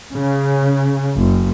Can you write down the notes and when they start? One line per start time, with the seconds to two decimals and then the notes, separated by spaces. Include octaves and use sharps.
0.13 C#3
1.17 F#1